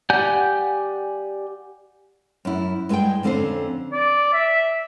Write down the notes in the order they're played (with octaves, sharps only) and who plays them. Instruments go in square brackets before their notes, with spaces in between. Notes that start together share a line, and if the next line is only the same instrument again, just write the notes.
[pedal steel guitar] G4 D5 F#5 G#5 G6
[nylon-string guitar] F#2 E4
G2 G#3 E4 G#4 G5
F2 D3 C4 C#4 C5
[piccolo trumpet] D5
E5